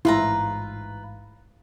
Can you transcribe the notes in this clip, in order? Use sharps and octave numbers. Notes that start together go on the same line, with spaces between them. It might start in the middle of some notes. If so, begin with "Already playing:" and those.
A1 G#2 E4 F4 B4 A#5